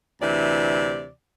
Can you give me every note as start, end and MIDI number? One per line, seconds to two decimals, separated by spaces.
0.21 1.09 38
0.21 1.09 48
0.21 1.09 52
0.21 1.09 74